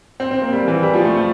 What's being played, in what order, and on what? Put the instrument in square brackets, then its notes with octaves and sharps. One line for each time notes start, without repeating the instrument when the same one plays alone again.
[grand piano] C4
C4
A#3
G3
E3
G3
F3
A3
A3